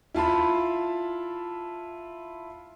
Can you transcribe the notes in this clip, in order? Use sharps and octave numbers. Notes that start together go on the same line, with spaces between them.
E4 F4 A5 B5